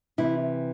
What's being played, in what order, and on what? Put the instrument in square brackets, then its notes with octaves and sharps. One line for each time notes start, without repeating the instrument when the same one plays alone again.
[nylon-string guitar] C3 E3 E4